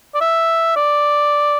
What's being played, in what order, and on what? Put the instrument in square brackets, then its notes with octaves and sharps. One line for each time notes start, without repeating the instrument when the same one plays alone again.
[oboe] D5
E5
D5